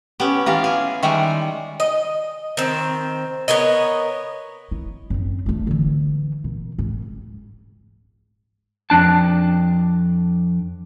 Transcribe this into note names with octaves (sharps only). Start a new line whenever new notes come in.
B3 C#4 G4
E3 F4 G4 F5 A#5
G#4
D#3 G3 G#3 E5 G5 C#6
D#5
D#3 C4
B3 A#4 C#5 D#5
E4
F#2 C4
A3 D4
D3 E3
A#2
G#2
F2 D4 A5